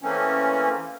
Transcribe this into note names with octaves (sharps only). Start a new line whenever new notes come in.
E3 A3 A#3 C4 C#4